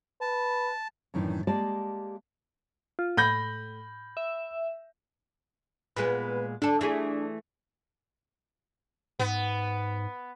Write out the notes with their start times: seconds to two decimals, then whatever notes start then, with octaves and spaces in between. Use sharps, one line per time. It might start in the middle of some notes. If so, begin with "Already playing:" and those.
0.21 B4 A5
1.14 F#2 A2 D#3 E3 D4
1.47 G#3 A#3 G4 D5 A5
2.99 F4
3.17 A2 B5 G6 A#6
4.17 E5
5.96 A#2 G#3 B3 B4
6.62 D3 D4 A4
6.81 E3 A3 G#4
9.19 G#2 B3